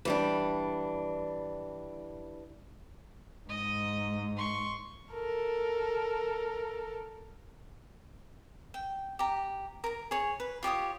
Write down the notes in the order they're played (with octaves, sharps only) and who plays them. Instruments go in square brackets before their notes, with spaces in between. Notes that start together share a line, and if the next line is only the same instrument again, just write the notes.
[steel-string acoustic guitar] E3 G3 D4
[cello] G#2 [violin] D#5
[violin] C6 C#6
[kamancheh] A4 A#4
[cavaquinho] G5
G4 A#5
A#4 A#5
G#4 C#5
B4
F4 G4 C#5 D#6